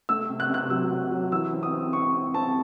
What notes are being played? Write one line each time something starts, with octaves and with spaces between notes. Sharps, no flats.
A3 E6
C3
F#6
C3 F#6
F#3 E6
C3
F#3
E3 E6
C4
D#6
C4
C4 C#6
C4
C4 A5